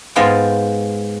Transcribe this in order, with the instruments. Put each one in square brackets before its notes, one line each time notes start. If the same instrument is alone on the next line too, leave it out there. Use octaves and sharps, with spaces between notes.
[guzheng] G#2 B3 F4 F5 G5 G#5